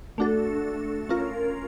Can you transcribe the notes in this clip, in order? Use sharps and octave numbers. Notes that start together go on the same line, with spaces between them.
A3 D4 F#4 A4
C#4 F4 A#4